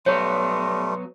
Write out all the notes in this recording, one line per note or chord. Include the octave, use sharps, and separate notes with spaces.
F#3 G3 A3 B3 C#5 C6